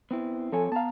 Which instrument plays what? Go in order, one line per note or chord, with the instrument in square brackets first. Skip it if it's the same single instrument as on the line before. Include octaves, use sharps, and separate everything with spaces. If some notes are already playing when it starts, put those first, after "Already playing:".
[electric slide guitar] B3 C4 E4
[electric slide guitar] F3 C4 C#5 [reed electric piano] A4 G#5
[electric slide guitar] B3 A#5 [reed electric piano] F5 A5